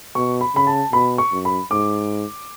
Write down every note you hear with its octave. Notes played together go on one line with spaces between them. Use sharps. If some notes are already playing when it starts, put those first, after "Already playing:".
B2 C#6
B5
C#3 B5
A5
B2 B5
C#6
F#2
B5
G#2 D6